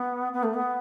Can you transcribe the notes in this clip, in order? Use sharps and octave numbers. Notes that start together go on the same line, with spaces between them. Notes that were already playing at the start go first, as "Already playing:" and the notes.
Already playing: B3
B3
A3
B3